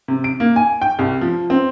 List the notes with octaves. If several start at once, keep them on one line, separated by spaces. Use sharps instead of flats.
C3
D7
A#3
G#5
G5
C2
F3
C4